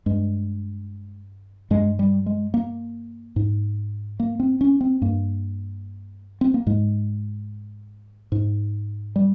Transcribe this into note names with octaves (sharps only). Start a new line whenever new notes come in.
G2 G#3
G2 G#3
G3
G#3
A#3
G#2
A#3
C4
C#4
C4
G2 A#3
C4
A#3
G#2 G#3
G#2
G3